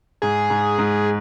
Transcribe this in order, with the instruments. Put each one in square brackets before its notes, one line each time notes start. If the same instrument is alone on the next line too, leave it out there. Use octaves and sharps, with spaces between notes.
[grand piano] G#2 [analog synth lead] G#4
[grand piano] G#2
G#2